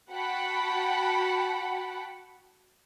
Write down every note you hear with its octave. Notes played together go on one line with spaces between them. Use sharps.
F#4 F#5 G5 A5 B5